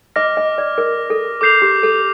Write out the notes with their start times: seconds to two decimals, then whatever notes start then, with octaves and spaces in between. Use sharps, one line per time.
0.16 D#5 D6 F6 A#6
0.37 D#5
0.58 D5
0.78 A#4
1.10 A4
1.41 A4 D6 G6 C7 F7
1.62 G4
1.83 A4